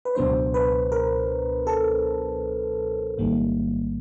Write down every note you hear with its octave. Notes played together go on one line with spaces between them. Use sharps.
B4
C#2 B2 F#3 B3 D4 C5
B4
A#4
A4
A1 G#2 D#3 G3 A#3